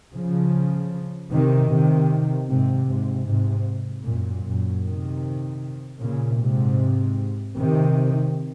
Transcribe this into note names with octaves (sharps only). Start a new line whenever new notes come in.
C#3 F3
C3 D#3
C3 D#3
G#2 C3
G#2 C3
G#2 C3
F#2 A#2
F#2 A#2
C3 D#3
A#2 C#3
G#2 C3
C3 D#3